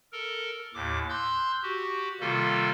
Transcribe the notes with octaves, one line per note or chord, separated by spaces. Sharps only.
A4 A#4
D#2 A2 D6
C6 E6 F#6 G6
F#4 G4
C3 D#3 G3 A#3 F4 A4